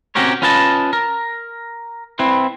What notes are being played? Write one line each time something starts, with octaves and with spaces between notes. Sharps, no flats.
C4 C#4 F#4 G4 A#4 C#5
C#4 F4 B4 D#5 A5
A#4
C4 E4 B4